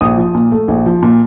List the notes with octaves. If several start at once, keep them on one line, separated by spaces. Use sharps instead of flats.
A#1 D#6
F3
A#2
A3
A#1
F3
A#2